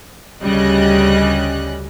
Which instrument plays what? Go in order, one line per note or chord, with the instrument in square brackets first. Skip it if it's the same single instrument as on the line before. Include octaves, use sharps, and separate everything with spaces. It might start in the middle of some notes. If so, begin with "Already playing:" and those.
[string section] D2 C#3 G3 D#5 F#6